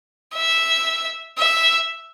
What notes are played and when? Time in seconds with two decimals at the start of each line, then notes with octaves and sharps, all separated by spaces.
0.35 E5
1.38 E5